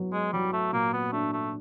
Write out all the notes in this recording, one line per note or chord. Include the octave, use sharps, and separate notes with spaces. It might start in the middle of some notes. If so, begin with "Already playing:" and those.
Already playing: F#3 B3
G#3
F#3 G3
A3
A#2 A#3
B3
A3 D4
A3